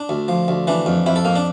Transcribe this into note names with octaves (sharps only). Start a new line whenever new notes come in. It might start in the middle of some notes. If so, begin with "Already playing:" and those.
Already playing: D4
D2
F3
D2
E3 D4
F2
F2 E4
A4
F2 A#3
D4